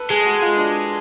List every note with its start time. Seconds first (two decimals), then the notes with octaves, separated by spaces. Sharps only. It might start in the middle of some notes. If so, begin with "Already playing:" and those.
Already playing: A4 B4
0.10 G#3 G#4
0.22 G#4
0.26 F#4
0.42 F4
0.58 D4